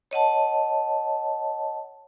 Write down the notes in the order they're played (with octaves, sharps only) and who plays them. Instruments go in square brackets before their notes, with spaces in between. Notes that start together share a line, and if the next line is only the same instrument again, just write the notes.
[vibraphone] C#5 D#5 F#5 A5